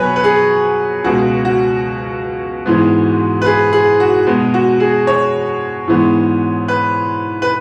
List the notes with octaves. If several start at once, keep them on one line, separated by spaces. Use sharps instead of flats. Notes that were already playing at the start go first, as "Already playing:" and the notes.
Already playing: B2 F#3 B3 B4 C#5 F#5 G#5
B4
G#4
C#2 B2 G#3 F#4
F#4
G#2 E3 G#3 B3
B4
G#4
G#4
F#4
B2 G#3 B3
F#4
G#4
C#5
G#2 E3 G#3 B3
B4
B4